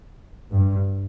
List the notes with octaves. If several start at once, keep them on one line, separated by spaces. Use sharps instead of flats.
G2